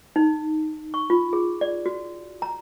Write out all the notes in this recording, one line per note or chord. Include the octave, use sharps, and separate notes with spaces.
D#4
C#6
F4
G#4
D5
F#4
A#5